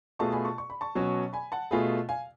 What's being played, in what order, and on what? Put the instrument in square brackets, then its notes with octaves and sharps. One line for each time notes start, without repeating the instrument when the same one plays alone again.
[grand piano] B2 A3 F4 G#4 [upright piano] A5 C#6
[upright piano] G#5 B5
A5 C#6
C#6
B5
A5 C#6
[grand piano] B2 F#3 C#4 F#4
[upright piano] G#5 B5
F#5 A5
[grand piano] B2 A3 F4 G#4 [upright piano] G#5 B5
[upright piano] F5 G#5